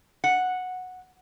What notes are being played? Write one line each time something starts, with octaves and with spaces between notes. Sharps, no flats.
F#5